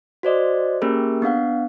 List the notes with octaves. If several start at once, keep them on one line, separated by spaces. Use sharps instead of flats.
F#4 C5 D5 D#5
A#3 C#4 G4 G#4 A#4
B3 D4 F5 F#5